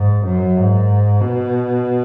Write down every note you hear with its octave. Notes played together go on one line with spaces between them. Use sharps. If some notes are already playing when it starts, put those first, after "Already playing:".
Already playing: G#2
F#2
G#2
B2